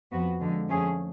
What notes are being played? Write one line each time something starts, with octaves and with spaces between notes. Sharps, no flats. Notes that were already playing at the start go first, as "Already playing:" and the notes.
F2 F3 B3 F#4
F2 D3 F3 G#3
F2 F3 A3 C#4 G#4